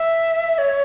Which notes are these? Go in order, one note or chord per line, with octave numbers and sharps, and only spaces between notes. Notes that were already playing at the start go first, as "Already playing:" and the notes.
Already playing: E5
C#5